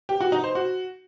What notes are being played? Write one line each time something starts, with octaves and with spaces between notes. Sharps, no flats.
G4
F#4
D#4
C5
F#4